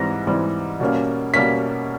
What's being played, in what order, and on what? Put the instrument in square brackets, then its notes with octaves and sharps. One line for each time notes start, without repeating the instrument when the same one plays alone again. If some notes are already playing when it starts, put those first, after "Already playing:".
Already playing: [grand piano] G#2 E3 G3 C4 A#6
G#2 E3 G3 C4
B2 G3 A#3 C#4
B2 G3 A#3 C#4 B6